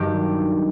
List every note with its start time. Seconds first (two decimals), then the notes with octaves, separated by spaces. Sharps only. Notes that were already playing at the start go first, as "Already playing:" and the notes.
Already playing: G2 D#3 F#3 G4